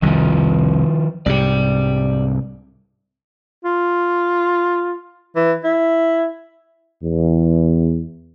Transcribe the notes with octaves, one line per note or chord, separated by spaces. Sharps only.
C2 F2 D#3 F3
C2 G#2 C3 G4 D5
F4
E3
E4
E2